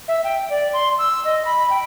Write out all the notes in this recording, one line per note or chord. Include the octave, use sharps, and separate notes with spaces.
E5
G5
D5
C6
E6
D#5
B5
G5